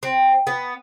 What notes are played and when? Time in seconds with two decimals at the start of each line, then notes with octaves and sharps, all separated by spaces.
0.03 C4
0.47 B3